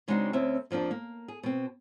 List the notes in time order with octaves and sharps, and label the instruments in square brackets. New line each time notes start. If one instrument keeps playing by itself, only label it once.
[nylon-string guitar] C#3 G#3 C4 D4 D#4 F#4
D2 C4 C#4 E5
F2 F3 A#3 D4 F4
A#3
G#4
B2 C4